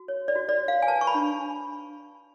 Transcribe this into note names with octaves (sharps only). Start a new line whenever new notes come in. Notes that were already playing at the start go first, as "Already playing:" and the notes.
Already playing: F#4
C#5
D5
F#4
D5
C#5
F5
G#5
B4 A5
C#6
B5
D4